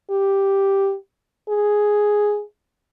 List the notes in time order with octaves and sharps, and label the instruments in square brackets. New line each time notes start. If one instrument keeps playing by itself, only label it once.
[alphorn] G4
G#4